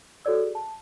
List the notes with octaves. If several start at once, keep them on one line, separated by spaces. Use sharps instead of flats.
F#4 A4 C#5 D5 E6
G#4
A5